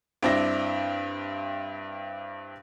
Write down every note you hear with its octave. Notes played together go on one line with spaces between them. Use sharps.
G2 C4 D4 E4 A#6